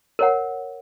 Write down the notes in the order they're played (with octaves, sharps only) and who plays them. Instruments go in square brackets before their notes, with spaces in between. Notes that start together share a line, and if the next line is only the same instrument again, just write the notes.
[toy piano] A#4 C#5 F#5